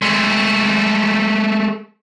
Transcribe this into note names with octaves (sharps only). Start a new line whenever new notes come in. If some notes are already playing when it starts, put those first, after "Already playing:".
G#3 A3